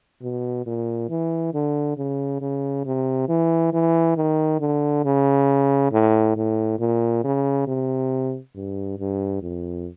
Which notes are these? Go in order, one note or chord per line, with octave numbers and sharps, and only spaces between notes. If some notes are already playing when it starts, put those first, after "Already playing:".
B2
A#2
E3
D3
C#3
C#3
C3
E3
E3
D#3
D3
C#3
A2
A2
A#2
C#3
C3
G2
G2
F2